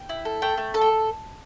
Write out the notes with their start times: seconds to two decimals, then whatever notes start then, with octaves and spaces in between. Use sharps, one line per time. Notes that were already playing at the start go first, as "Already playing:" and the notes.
Already playing: G5
0.09 E4
0.25 A4
0.42 A3 G5
0.57 A3
0.74 A4 A5
0.81 G5